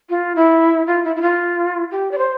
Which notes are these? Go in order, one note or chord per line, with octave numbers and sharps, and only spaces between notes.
F4
E4
F4
E4
E4
F4
G4
D5
C5